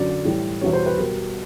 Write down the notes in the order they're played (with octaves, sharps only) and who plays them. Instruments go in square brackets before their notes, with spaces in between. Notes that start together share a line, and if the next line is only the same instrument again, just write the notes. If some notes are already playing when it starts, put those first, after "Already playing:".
Already playing: [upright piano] F#2 D3 F#3 D5
A2 E3 G3
E2 B2 G3 C#5
C5
B4
B2 G3 A#4